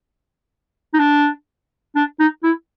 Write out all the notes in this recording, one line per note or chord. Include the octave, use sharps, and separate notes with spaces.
D#4
D4
D4
D#4
E4